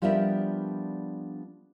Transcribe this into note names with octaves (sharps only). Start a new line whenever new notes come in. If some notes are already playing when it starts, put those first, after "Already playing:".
F3 G3 B3 D4 A#4 E5